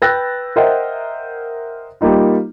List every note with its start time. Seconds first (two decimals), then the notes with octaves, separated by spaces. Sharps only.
0.02 B4 G5 E6 F#6 A6 A#6
0.56 A#4 C5 D#5 E5 F#5 G5
2.01 G3 A#3 D#4 F4